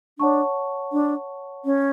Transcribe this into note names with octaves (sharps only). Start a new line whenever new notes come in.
D4 C#5 F#5 A5 C#6
D4
C#4